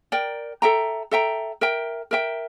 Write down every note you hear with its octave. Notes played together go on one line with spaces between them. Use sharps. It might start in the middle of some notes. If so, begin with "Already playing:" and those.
A#4 D5 G5
A4 E5 G5 A#5
A4 E5 G5 A#5
A#4 E5 G5
A#4 E5 G5